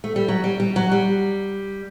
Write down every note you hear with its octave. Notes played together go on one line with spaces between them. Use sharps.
A3
G3
F#3
G3
G3
F#3
G3